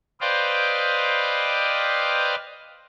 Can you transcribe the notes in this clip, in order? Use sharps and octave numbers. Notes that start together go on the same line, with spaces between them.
B4 C5 D5 D#5 F5 G5